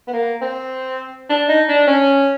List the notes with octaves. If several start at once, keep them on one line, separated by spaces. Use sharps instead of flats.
B3
A#3
C4
D4
D#4
D4
C#4